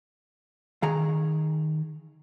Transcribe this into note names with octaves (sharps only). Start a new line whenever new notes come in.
D#3 G#4 A#5